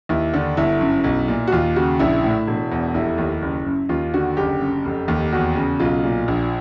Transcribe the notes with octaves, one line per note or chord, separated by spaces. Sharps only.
D#2 E4
D3 D4
G1 E4
F#2
B1
A#2
F#4
D#2 F4
C#3 F#4
A#1 E4
A2
E1
E2
F1 E4
D#2
F#1
F#2
D#2 F4
D3 F#4
F#1 G4
F#2
F1
D#2
E2 F#4
C#3
B1 F4
A#2
A#1